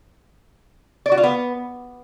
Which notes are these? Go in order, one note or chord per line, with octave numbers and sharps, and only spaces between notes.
D5
F#4
F4
B3